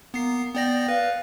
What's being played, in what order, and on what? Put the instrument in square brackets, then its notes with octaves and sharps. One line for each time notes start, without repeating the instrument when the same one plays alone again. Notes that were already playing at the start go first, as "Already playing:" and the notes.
[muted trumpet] A#3 [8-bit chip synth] B3 C7
[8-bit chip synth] B3 D5 A#6 [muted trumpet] G5
[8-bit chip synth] B4 [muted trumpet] F5